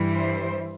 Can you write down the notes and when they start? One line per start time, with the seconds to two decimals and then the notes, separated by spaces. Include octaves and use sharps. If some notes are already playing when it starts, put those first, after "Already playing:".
Already playing: G2 E3 G3
0.17 C5